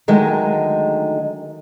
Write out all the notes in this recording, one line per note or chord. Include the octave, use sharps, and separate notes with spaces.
D3 D#3 F#3 G#3 A3